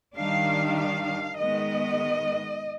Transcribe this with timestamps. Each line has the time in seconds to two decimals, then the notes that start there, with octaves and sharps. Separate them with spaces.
0.16 D#3 G3 D4 F5
0.77 F5
1.39 D#3 G#3 B3 D#5